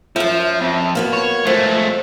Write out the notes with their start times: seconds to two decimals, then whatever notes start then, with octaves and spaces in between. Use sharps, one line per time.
0.16 F#2 F3 E5
0.60 F2
0.95 A#3 B3 F#4
1.13 C#5
1.47 F3 G#3 A3